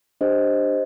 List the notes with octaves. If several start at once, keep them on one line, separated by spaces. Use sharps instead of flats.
D4 G4 C5 D#5